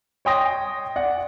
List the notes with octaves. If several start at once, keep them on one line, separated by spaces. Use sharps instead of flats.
C#5 D#5 G5 C6 D#6 A#6
D5 F#5